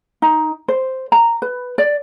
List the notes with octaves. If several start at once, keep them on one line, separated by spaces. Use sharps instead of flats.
D#4
C5
A#5
B4
D5